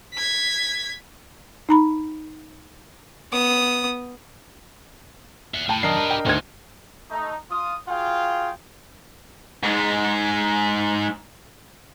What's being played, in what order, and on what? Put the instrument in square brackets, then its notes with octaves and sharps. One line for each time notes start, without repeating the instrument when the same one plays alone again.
[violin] G#6 B6
[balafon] D#4 A#5 B5
[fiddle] B3 D#6
[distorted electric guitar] E5 F#5
[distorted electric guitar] A2 [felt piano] G5 A5
[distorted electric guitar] F#2 D#3 [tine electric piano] D4 A#4 D#5 [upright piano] C7
[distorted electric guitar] G4 B4
[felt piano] G5
[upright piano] D2 G#6 [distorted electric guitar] D#3 D#4
[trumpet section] A3 D#4
F4 D#6
F4 F#4 G#4 F5 G5
[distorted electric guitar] G#2 G#3